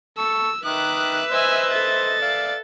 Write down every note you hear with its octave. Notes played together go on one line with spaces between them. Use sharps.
A4 C#6 E6
D#3 B4 E5 D6 D#6 F#6
C5 D#5 G#5 E6
A4 A6
D5 F5